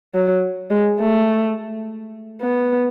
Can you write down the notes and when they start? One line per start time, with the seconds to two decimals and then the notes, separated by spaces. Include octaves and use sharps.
0.15 F#3
0.70 G#3
1.00 A3
2.42 B3